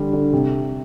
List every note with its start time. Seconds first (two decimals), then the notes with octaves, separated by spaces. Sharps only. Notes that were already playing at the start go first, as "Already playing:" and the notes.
Already playing: D3 G3
0.13 D3
0.33 C3